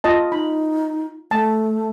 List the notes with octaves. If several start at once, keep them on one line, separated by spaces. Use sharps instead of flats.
F4 D#5 A5
D#4 B5
A3 A5